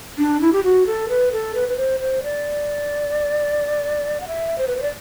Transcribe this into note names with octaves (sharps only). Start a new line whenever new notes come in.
D4
E4
G4
F#4
A4
B4
A4
B4
B4
C5
C5
D5
F#5
E5
C5
B4
C5
D5